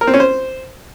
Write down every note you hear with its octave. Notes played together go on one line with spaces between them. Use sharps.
A#4
C4
C#4
C5